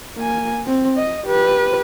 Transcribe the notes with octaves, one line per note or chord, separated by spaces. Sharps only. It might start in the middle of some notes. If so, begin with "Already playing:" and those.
A#3 G#5
C4
D#5
G4 B4